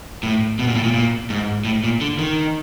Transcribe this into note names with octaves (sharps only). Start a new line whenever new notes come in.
A2
B2
A#2
A2
A#2
A#2
G#2
A2
A#2
D3
D#3